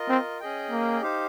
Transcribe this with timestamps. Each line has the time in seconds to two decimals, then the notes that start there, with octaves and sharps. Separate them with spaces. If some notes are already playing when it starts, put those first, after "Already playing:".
Already playing: F4 A#4 D#5
0.09 C4
0.40 C#4 G#4 D#5 G5
0.71 A#3
1.02 D#4 G4 C5 F5